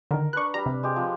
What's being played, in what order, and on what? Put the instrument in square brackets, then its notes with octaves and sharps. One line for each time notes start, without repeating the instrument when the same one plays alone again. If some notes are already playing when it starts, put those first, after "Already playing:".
[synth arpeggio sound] D3 D#3 [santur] A#4
[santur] D4 B4 [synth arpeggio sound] C#6 F#6
[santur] G3 B5 [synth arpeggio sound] A#5
[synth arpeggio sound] C3
[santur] G#3 G4
F3